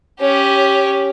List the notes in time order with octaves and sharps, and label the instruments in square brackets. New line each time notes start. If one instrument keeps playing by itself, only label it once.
[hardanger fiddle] C#4 G4